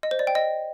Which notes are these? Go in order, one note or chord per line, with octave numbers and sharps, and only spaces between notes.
D#5
C5
D5
G5
D#5